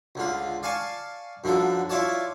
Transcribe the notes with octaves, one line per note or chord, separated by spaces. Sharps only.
C#2 D3 F4
D5 F5 G#5 A5 C#6
F#2 D3 F3 A4
E4 F4 C#5 D5 A5